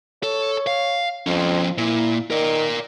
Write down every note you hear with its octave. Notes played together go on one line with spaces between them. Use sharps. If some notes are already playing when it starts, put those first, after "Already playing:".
A4 C#5
F5
F2 F3 C#4
A#2 E4
D#3 A#4 D5